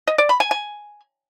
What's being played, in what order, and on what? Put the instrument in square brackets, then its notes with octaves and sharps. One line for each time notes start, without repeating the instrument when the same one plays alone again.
[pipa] D#5
D5
B5
G#5
G#5